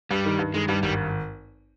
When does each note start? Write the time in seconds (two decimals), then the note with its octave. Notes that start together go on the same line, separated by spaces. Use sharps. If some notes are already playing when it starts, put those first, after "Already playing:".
0.11 G2 G3
0.25 D#3
0.39 G2
0.54 D#3 G#3
0.68 G2 G3
0.83 G#1 G3